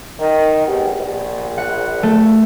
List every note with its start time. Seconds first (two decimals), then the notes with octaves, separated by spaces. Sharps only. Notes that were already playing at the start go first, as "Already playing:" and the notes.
0.20 D#3
0.67 G#1 B3 G4
0.98 A#1
1.58 F#5
2.03 A3